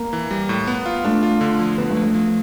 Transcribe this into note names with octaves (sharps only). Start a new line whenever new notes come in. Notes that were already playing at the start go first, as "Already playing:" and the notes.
Already playing: A#3
E3
G3
A2
B3
F4
A3 D4
F4
D3
F3
D3 B3
A3
F3
A3
F3